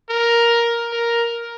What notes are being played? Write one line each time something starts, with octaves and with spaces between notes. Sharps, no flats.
A#4
A#4